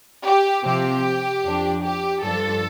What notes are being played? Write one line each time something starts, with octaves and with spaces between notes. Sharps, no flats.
G4
C3 F3 C4 G4
F2 F3 D4
G4
G2 F3 D4 A4